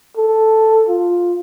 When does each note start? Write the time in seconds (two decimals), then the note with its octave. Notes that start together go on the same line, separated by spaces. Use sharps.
0.18 A4
0.89 F4